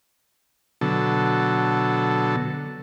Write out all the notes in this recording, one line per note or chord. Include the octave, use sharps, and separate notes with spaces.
B2 D3 F#3 A4